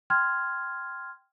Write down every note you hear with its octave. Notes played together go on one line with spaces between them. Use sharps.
G5 C6 F6 G#6